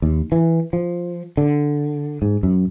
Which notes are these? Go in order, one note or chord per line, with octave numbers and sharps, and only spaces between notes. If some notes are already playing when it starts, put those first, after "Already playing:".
D#2
E3
F3
D3
G#2
F#2